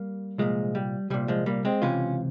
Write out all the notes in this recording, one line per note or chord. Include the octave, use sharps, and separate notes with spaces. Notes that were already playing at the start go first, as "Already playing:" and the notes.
Already playing: G3 A#3
C2 A#2 F3 G#3
G3
C2 A#2 G3
F3 G#3
G3 A#3
G#3 C4
C#2 C3 E3 C#4 F4